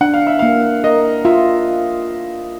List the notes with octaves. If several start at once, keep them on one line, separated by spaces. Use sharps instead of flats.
D4 F#5
F5
E5
A#3 F5
A#4 D#5
F4 E5